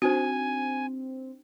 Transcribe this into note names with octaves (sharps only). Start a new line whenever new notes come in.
C4 D4 D#4 F#4 C5 G#5